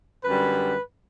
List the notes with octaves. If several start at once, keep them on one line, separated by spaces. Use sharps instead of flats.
F#2 D3 G3 B4